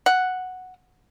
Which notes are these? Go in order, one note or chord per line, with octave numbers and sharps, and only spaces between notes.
F#5